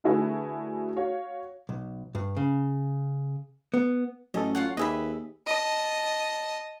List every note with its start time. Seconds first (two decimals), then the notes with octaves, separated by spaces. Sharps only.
0.04 D3 A3 E4 F#4 G#4 B4
0.96 F#4 C#5 F5
1.69 B1
2.15 G2
2.37 C#3
3.74 B3
4.34 A1 F#3 C#4 A4 D#5
4.55 F4 C#5 F#5
4.77 D#2 G4 G#4 B4 D#5 E5 B5
5.46 D#5 A5